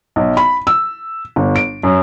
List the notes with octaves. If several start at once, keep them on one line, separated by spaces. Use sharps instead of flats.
B1
B5
E6
G1
D7
F#2